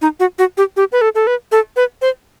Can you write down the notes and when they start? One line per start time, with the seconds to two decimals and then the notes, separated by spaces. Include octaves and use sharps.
0.02 D#4
0.20 F#4
0.39 F#4
0.57 G4
0.77 G4
0.92 B4
1.01 A4
1.15 A4
1.27 B4
1.52 A4
1.76 B4
2.02 C5